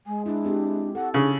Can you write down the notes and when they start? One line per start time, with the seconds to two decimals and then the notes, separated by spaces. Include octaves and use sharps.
0.07 G#3 G#5
0.26 D4 E4
0.45 C4 G4
0.95 A4 F#5
1.14 C#3 D4 G#4